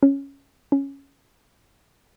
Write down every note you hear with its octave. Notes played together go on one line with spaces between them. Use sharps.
C#4
C#4